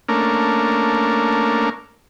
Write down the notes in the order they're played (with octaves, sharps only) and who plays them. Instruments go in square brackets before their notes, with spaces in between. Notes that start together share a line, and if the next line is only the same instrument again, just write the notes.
[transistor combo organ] A3 A#3 C#4 D4 A#4